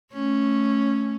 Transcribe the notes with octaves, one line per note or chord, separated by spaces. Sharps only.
A3 C#4